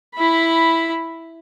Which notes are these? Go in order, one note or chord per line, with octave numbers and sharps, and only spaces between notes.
E4 B5